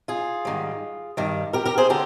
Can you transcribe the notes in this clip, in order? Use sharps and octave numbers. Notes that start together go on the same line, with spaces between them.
F4 G#4
G#2 D#3 G3
G2 D#3 G3
G4 A#4
G4 A#4
G#4 C5
D3 G4 A#4